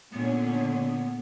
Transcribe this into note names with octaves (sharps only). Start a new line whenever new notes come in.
A#2 D3 B3 C#4